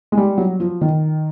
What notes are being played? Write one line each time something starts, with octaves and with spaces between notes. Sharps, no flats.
G#3
G3
F#3
F3
D#3